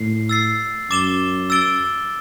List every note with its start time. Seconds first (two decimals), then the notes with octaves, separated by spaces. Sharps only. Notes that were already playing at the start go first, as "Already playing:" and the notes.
Already playing: A2 C7
0.29 E6 A6 C7
0.90 F#2 D6 A6 E7 G7
1.50 E6 A6 D7 G7